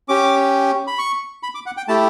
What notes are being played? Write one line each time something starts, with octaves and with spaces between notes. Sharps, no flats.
C#4 G4 D6
B5
C#6
B5
D6
F#5
G5
A3 E4 G4 A5